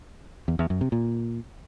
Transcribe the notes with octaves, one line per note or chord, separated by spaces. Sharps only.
E2
E2
F#2
C3
A#2